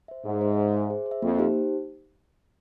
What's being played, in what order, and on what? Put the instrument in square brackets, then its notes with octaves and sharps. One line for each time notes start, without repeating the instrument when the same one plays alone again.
[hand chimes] C5 E5
[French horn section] G#2 [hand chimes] G#4
[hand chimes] C5 E5
G#4
C5 E5
G#4
C5
E5
[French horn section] F2 [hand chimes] A#3
[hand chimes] D#4 G4 C5